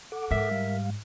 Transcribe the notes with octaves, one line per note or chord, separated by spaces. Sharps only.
A4 F#5 D6
G#2 A#4 E5
G3 F5